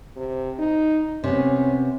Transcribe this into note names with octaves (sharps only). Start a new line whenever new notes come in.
C3
D#4
C3 B3 C#4